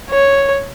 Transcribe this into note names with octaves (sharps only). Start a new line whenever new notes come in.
C#5